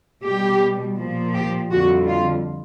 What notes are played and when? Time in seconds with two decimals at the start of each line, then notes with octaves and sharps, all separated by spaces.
0.25 B2 G3 G4
0.98 A#2 F3
1.34 G4
1.71 F2 D3 G3 F#4
2.07 F4